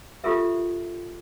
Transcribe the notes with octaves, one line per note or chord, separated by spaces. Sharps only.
F4 G4 A4 A#4 E5